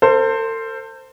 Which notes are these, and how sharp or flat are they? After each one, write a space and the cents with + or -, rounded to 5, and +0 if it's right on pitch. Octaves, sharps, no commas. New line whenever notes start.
A4 +40 C5 +0